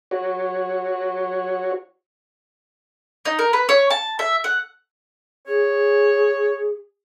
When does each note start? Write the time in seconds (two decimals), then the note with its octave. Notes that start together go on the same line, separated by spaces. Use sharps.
0.11 F#4 C#5
3.25 D#4
3.39 A#4
3.53 B4
3.69 C#5
3.90 A5
4.19 E5
4.44 F#5
5.47 G#4 C#5